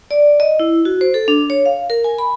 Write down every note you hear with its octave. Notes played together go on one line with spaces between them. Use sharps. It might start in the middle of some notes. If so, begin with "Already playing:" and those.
D5
D#5
E4
F#4
C5
A4
D4
C#5
F5
A#4
G#5
B5